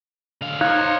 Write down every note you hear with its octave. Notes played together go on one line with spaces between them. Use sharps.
D3 F5
D#4 C5 C#5 F5 F#6 G#6